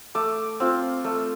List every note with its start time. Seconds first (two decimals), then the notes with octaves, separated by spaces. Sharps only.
0.15 A3 D6
0.60 C4 F4
1.04 A3